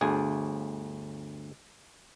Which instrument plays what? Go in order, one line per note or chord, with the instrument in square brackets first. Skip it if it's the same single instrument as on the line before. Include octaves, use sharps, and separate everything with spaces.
[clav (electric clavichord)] G1 D2 G#4